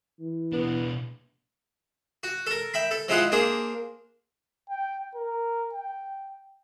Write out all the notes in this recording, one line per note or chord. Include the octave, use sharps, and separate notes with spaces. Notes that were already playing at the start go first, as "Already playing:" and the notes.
E3
B2 B3 D4
F#4
A4 A#4
E5 G5 B5
A4
F3 G#3 E4 F4 G#4 F#5
A#3 D4 G#4 C5
G5
A#4
G5